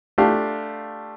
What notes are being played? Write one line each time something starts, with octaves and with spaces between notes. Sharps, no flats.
A3 D4 F4 G4 F5